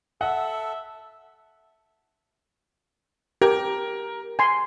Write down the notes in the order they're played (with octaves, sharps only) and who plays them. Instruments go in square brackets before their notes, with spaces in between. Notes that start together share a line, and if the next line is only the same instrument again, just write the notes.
[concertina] A4 [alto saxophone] E5 [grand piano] F#5
[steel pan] G4 [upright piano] A#4
[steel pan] G#5 C6